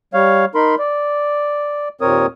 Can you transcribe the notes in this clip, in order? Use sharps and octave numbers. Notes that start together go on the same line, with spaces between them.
G3 C#5 F5
D#4 A#4 B5 C6
D5
D#2 A#2 C4 A#4 C#5 D#6